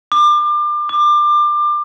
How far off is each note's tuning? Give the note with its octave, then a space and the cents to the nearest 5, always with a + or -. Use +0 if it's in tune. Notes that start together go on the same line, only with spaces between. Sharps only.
D6 +30
D6 +25